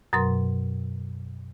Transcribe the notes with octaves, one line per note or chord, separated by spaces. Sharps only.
F#2 B2 F#3 A#4 C6